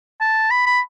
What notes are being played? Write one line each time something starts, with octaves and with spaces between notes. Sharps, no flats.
A5
B5
B5